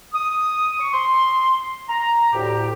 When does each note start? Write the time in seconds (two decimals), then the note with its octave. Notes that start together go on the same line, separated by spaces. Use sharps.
0.13 D#6
0.79 C#6
0.92 C6
1.88 A#5
2.32 D2 A2 G4